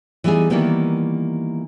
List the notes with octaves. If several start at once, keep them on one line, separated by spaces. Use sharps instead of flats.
E3 G3 B3 D#4 G#4
D#3 E3 G3 A#3 B3